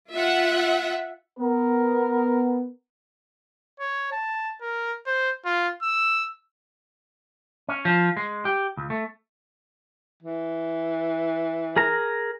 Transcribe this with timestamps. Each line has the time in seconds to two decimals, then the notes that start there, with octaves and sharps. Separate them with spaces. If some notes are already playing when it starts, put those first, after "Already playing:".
0.12 F4 E5 F#5
1.39 B3 A#4
3.80 C#5
4.12 A5
4.61 A#4
5.06 C5
5.45 F4
5.83 E6
7.69 C#4
7.85 F3
8.17 G#3
8.45 G4
8.77 C#2
8.90 A3
10.23 E3
11.76 G#4 A#4 A#5